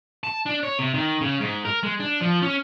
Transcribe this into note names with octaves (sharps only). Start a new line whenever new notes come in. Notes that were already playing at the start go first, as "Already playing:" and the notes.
A5
D4
C#5
C3
D#3
C#3
G#2
A#4
G#3
D4
F3
C#4